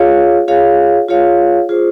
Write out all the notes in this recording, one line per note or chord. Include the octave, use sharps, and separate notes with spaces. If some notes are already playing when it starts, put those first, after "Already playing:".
Already playing: F4 G#4 C#5 F5
F4 G#4 C#5 F5
F4 G#4 C#5 F5
F4 G#4 C5